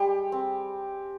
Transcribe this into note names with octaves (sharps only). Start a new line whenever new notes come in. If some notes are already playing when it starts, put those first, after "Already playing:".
Already playing: G3 G#3 G4
C4